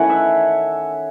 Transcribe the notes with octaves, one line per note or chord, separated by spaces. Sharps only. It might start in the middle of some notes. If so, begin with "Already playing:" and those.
Already playing: D#3 A3 C#4 E4 F#5 G#5
E5